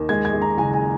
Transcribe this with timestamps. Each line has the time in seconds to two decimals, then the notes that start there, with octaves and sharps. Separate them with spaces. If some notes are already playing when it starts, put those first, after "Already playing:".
Already playing: D#2 D#3
0.09 G#3 G#6
0.25 G#6
0.33 G#3
0.42 A#5
0.57 F#1 G#5
0.74 G#5